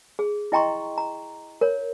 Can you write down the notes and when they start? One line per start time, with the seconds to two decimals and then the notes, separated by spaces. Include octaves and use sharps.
0.19 G#4
0.52 E4 D#5 G5 A#5 C6 C#6
0.98 A#5
1.61 A#4 C#5